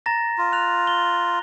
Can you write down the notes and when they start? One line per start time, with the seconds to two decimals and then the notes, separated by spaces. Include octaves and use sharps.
0.06 A#5 A6 A#6
0.38 F4
0.52 F#6 F7
0.87 G7